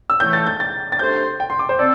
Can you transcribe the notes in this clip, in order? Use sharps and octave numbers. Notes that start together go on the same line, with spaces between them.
E6
A2 E3 A3 G6
A6
G6
A6
A6
C3 A3 D4 C5 G6
G5
C6
D6
C5
C4 A4 D5